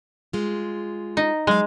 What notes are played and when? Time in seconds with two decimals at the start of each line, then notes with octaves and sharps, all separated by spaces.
0.33 G#3 F4
1.17 D#4
1.47 F#3 G#3 F5